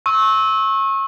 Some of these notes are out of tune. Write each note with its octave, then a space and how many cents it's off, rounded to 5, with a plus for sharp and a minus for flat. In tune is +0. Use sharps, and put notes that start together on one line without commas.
C#6 -30 E6 -20